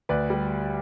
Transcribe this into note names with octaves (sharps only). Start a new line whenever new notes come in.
D2 B4 D5
G3